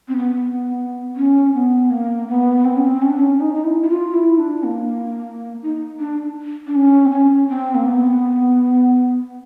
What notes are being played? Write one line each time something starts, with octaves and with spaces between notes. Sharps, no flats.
C4
B3
C#4
B3
A#3
B3
C4
C#4
C4
C#4
D4
C#4
D#4
D#4
E4
E4
F4
E4
D4
A#3
D#4
D4
D4
C#4
C4
C#4
C4
A#3
B3